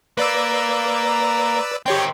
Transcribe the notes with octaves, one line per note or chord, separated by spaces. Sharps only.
A#3 B4 D5 E6
D#3 C4 G4 C#5 G5